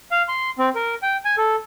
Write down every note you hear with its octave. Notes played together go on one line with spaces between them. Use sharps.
F5
C6
C4
A#4
G5
G#5
A4